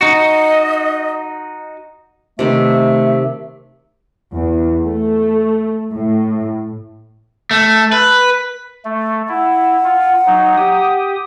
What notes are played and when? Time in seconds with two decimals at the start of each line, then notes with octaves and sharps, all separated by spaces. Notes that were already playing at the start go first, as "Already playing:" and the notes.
0.01 D#4 F#4 D#5
2.39 C3 D#3 A3 E5
4.35 E2
4.86 A3
5.92 A2
7.51 A3
7.92 B4
8.85 A3
9.29 E4 F#5
9.85 F4
10.26 F#3 D#4
10.57 G4 D#6